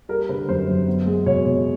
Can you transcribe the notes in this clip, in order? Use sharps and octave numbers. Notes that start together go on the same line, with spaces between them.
G3 A#4
D3 B4
F#2 C5
F#2
B3
G#3
B2 C#5
B2